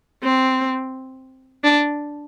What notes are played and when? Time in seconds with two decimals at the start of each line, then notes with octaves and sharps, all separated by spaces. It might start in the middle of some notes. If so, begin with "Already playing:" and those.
0.23 C4
1.64 D4